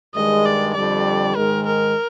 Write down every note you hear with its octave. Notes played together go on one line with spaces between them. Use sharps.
G2 D#3 G#3 D#5
D5
F2 D3 G3 D5
G#2 D#3 G#3 A#4
A#4